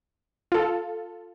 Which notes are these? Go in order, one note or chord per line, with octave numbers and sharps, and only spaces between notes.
F4 A4